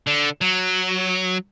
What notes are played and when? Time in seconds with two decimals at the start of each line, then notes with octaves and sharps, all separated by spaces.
0.07 D3
0.41 F#3